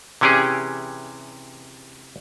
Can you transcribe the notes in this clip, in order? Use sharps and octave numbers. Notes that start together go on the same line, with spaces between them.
C3 E3 C#4 G4 G#4